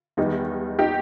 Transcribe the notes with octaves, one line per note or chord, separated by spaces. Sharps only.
E2 D#3 G3 D#4
D#4 G4